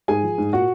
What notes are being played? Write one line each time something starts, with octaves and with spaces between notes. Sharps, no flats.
G#2 G#4 G#5
F3
G#2
A#2 F#4 F#5